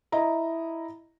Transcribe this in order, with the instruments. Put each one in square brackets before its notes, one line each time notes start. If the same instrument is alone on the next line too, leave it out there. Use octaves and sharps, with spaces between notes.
[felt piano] E4 D#5 A#5